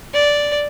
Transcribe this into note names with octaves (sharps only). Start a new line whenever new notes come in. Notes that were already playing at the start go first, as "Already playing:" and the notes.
D5